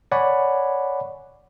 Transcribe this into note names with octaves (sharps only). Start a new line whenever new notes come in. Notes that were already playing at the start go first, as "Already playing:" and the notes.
C#5 D5 F#5 G#5 B5